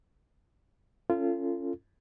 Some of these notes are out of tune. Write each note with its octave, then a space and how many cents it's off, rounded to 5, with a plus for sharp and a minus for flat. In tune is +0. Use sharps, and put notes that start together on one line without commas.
C#4 -5 F4 -25 A4 +20